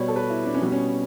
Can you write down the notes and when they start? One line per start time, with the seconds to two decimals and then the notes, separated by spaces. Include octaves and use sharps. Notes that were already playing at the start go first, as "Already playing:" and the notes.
Already playing: B2 G3 B3 C#5 D5
0.08 A4
0.16 B4
0.30 E4
0.46 D4
0.54 C#4
0.61 B2 G3 B3
0.72 C#4